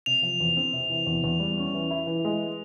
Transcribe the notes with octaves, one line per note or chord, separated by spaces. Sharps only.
C3 F7
F3
E2
C4
C3
E3
E2
E2
G3
C#4
E3
E4
E3
G#3